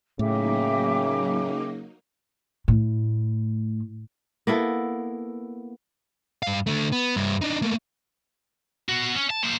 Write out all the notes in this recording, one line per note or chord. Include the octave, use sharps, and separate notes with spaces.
A2 C#3 F#3 A#3 D#4 E5 G5 D6
A2
A#3 B3 E4 A4
G2 F5
D3 A3
B3
G2 E4
D4 D#4
A3 A#3
B2 F#4
C#4
A5
A#2 C5